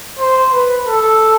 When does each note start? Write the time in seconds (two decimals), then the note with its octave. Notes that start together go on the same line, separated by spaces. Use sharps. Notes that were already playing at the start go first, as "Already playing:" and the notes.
0.19 C5
0.53 B4
0.87 A4